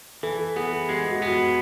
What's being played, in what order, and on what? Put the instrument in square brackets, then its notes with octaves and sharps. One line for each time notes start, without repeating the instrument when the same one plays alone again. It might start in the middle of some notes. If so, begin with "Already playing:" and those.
[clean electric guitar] E3 [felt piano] A4
[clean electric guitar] B3 [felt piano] G#4
[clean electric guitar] G#3 [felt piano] G4
[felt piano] F#4
[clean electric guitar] B3